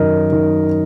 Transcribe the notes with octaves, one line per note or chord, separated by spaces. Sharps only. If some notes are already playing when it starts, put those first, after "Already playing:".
Already playing: F#2 D#3 A#4 D#5
D#3